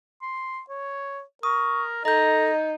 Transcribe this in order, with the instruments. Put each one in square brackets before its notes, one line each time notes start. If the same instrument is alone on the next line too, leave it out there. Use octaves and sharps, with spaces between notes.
[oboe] C6
C#5
[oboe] A#4 [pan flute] C#6 [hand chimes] D#6
[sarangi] D#4 [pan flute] A4 [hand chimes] D#5 G6 [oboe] A#5